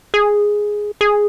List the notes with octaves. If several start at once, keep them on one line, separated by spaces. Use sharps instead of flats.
G#4
G#4